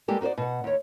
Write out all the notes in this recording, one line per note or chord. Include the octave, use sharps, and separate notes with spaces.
G3 G#3 A#3 G4 A4 B4
D#4 F#4 B4 C5 D5
B2 F#5
D#2 C#5